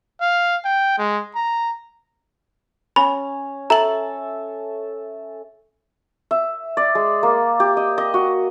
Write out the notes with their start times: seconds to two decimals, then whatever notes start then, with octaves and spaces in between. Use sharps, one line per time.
0.21 F5
0.65 G5
0.98 G#3
1.35 A#5
2.96 C#4 B5
3.70 A4 E5 A5 A#5 F#7
6.31 E5
6.77 D5
6.95 G#3
7.23 A#3
7.60 G4
7.77 D#5
7.98 D#5
8.14 F#4